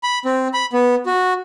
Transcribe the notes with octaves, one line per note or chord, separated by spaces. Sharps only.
B5
C4
B5
B3
F#4